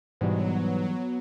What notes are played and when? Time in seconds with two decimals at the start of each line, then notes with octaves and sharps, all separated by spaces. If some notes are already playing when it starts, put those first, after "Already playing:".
0.21 G#2 B2 E3 F#3 G3 B3